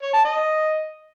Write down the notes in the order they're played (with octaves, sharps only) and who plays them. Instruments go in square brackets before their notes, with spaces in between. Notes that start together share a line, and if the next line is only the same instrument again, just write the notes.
[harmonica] C#5
A5
D#5